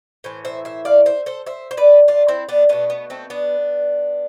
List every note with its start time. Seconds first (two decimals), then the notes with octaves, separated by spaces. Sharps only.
0.24 A2 E3 C5
0.45 C5 E5
0.65 C5 E5
0.85 D5 F5
1.06 C5 E5
1.26 A4 C5
1.46 C5 E5
1.71 C5
1.77 B4 D5
2.08 D4 F4
2.28 C4 E4
2.49 B3 D4
2.69 B2 A3 B3 D4
2.90 B3
3.10 A3 C4
3.30 B3 D4